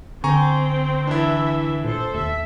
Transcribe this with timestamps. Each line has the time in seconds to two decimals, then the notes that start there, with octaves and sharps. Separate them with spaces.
0.24 D3 C4 G5 G#5 A#5 C#6
1.07 E3 D4 E4 E5
1.84 A#2 A4 C5
2.14 D#2 E5